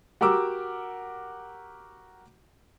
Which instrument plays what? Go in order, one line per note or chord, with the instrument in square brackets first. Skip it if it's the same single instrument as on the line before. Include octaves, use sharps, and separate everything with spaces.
[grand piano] F#4 G4 A#4 D6 E6